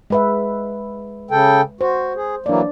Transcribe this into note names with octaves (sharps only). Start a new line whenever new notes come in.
G#3 B4 E5
C#3 A4 G5
F#4 C5
G#4
E3 F#3 A#3 D4 D5